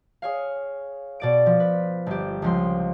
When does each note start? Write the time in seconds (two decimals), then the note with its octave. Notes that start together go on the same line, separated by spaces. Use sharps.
0.22 G#4 C#5 F5
1.20 B2 D5 D7
1.46 F3
1.60 B4
2.06 G1 G4
2.42 C#2 F3 C6